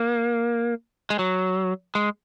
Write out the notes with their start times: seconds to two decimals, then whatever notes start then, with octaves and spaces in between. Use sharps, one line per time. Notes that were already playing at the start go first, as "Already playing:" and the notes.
Already playing: A#3
1.10 G#3
1.19 F#3
1.95 G#3